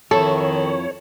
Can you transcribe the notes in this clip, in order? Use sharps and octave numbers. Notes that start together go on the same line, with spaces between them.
F2 D#3 E4 A4 C#5 E5